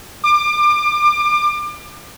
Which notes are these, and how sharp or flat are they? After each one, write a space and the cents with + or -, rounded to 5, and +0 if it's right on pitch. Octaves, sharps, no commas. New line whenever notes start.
D6 +30